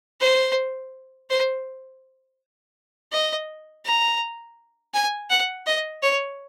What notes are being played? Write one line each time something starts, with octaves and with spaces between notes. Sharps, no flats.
C5
C5
D#5
A#5
G#5
F#5
D#5
C#5